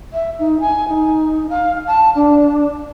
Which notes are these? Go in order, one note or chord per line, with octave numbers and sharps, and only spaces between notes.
E5
D#4
G#5
D#4
F5
A5
D4